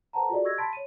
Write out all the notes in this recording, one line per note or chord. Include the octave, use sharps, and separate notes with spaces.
A4 B4 C5 F#5 A5 A#5
F4 F#4 G#4 A4 D5 D#5
G4 C#6 E6 G#6 A#6
A5 B5 C6 A6 B6 D7
C#5 D#7